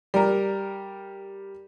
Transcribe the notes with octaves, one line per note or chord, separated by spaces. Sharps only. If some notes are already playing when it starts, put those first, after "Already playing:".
G3 A#4